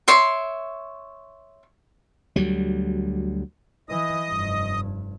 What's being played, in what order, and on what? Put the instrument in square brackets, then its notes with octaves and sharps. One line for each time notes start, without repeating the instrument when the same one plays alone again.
[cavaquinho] C#5 E5 C6 D6
[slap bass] D2 F#3 G3
[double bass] E3 [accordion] D#5 D#6
[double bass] F1 G2